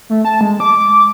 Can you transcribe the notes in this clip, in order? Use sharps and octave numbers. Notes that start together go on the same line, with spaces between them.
A3
A5
G#3
D6